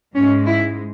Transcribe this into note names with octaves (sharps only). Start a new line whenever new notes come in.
G#2 G#3 C#4
E4